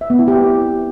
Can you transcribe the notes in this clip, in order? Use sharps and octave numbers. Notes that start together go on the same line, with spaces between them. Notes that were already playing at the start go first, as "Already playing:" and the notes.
E5
B3
E4
G4